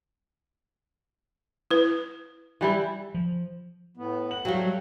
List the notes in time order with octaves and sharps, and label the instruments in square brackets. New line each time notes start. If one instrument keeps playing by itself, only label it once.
[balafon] E4 B4
[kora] E3 G3 E4
[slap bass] F3
[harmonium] A2 B3
[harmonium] F#5 [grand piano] F#7
[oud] F#3 G3 [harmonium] A3 C#5 [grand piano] F5 G5